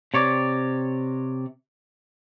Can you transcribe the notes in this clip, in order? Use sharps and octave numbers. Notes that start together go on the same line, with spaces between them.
C3 C#5 D5